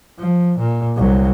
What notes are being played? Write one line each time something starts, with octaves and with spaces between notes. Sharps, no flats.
F3
A#2
C2 F#3